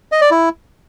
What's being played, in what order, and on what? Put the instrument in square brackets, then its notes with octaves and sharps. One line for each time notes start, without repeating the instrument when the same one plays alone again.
[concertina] D#5
D5
E4